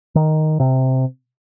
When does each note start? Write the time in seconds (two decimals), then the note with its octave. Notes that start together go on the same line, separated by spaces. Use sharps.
0.15 D#3
0.60 C3